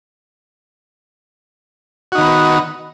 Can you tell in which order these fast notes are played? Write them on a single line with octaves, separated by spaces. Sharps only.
F#4 D#4 D#3 B3